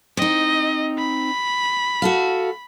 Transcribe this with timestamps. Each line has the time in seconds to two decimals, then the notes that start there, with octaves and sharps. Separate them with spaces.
0.17 C4 D#4 D#5
0.98 B5
2.02 F#4 A4 F5